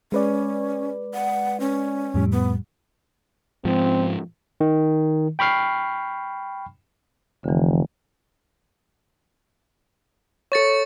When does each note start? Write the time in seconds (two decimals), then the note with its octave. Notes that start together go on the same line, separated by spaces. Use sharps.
0.12 G#3 C#4 B4 D5
1.14 F#5
1.60 C#4
2.14 F2 A2 G3
2.32 B3
3.65 G#2 F3 C4
4.61 D#3
5.39 G5 B5 C#6 F6 C7
7.44 F1 D3 E3
10.52 A4 C#5 C#6 A6 C#7